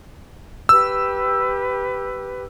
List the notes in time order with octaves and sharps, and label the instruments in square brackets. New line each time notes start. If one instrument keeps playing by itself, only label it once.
[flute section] G4 B4 [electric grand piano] E6